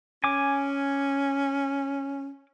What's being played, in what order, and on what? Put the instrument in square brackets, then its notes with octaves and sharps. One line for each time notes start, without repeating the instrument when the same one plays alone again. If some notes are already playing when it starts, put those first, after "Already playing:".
[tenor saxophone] C#4 [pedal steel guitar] G#5 D6